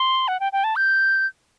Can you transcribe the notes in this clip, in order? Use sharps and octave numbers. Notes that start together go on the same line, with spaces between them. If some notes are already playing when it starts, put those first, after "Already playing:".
Already playing: C6
F#5
G5
G5
A5
G6